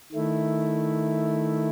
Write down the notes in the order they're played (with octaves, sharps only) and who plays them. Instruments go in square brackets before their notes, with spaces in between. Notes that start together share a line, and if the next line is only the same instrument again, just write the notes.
[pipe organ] D#3 A3 E4